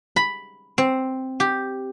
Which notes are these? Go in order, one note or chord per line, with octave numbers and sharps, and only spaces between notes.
B5
C4
G4